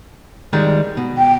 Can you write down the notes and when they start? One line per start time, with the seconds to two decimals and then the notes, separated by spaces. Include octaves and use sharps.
0.53 D#3 G3 G#3
0.97 B2
1.17 G5